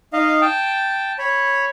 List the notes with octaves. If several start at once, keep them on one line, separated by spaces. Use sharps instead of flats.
D#4 D#5 F5
G5 A5
C#5 B5